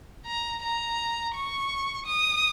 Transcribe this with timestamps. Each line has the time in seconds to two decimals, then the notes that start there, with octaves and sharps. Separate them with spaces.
0.26 A#5
0.63 A#5
1.35 C#6
2.06 D#6